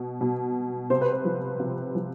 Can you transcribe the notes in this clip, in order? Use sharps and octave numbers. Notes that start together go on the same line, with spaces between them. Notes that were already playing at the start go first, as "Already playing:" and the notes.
Already playing: B2
B2
C3 C5
B4
C5
F3
C3
F3